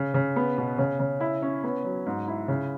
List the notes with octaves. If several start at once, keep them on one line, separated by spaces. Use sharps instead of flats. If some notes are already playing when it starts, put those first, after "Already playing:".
Already playing: C#3
C#3
B3
B2
C#3
C#3
E4
C#4
B3
F#3
G#2
E4
C#3